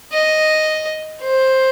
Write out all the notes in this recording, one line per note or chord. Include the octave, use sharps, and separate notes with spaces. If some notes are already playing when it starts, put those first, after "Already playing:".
D#5
C5